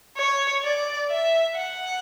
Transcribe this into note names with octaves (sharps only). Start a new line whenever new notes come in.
C#5
D5
E5
F#5